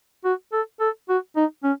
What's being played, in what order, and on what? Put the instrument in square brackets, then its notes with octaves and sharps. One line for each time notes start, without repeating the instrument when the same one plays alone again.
[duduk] F#4
A4
A4
F#4
D#4
C#4